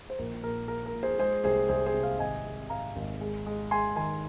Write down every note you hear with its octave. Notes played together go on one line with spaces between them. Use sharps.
C5
A#1 A#4
A#2 A#4
A#3 A#4
A#4
A#2
G#4 C5
G#3 G#4 C5
C2 G#4 C5
C2 G#4 C5
G#4 C5
C3
C5 F5
G#1 D#5 G#5
G#3
G#2 F5 A#5
G#1
G#3
G#3
G#3 G#5 C6
D#3 G#5 C6